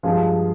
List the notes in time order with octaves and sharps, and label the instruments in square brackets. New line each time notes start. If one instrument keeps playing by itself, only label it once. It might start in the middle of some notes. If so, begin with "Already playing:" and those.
[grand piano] G2 F3 G#3 F4 G#4